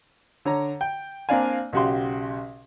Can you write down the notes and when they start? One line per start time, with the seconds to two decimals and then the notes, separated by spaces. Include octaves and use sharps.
0.45 D3 C#5 A#5
0.81 G5
1.29 A#3 C4 D4 D5 F5 G#5
1.73 B1 C#3 F#4 G4 C6